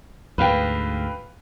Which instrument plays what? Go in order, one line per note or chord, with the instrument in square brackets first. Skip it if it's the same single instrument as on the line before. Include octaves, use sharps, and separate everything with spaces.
[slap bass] D2 G#2 [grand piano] B4 F5 G5